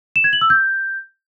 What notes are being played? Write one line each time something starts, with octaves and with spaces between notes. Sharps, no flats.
E7
G#6
F#7
E6
G6